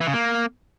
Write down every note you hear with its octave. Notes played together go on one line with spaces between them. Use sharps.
E3
C#3
A#3